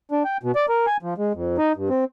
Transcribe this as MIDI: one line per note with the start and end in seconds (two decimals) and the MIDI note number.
0.12 0.23 62
0.25 0.37 79
0.43 0.52 47
0.56 0.66 74
0.69 0.86 70
0.87 0.97 80
1.03 1.14 53
1.18 1.33 56
1.34 1.57 41
1.58 1.73 63
1.76 1.89 43
1.89 2.04 60